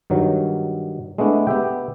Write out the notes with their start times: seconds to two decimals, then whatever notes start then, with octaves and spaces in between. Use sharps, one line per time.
0.10 G2 D#3 F#3
1.18 G#3 A3 B3 D4 E4
1.47 B3 G4 E5 G5